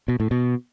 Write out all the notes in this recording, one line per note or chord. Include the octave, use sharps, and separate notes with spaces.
B2
A2
B2